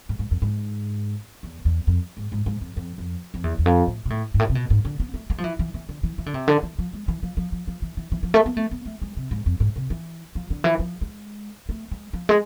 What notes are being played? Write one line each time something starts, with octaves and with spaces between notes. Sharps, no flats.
G#2
G#2
F2
G#2
E2
E2
F2
G#2
G#2
G#2
F2
F2
F2
F2
E2
E2
F2
A2
B2
A2
G#2
A2
C3
B2
G#2
D3
B3
A3
G#3
F3
E3
E3
E3
D3
E3
E3
D3
C3
D3
E3
F3
G#3
E3
F3
F3
F3
F3
E3
E3
E3
F3
A3
B3
A3
B3
A3
G#3
C3
G#2
F2
G#2
C3
E3
F3
D3
E3
F3
G#3
A3
G#3
F3
G#3